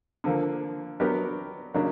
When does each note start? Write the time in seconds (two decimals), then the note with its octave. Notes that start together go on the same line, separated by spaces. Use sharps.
0.24 D3 F3 A#3
1.00 F#3 B3 D4 G4 A#4
1.74 C#3 F#3 A#3 D4